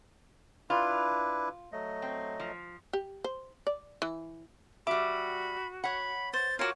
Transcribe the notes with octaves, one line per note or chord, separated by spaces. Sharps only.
D4 E4 F4 B4
F#3 A3 D#5
C4
F3
G4
C5
D5
E3
G3 F#4 E5 B5 D6
C#5 F#5 B5
C5 A6
F4 F#4 A#4 C#5 D6